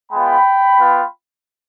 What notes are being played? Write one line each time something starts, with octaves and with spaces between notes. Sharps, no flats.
G#3 B3 F4 G5 B5
B3 F4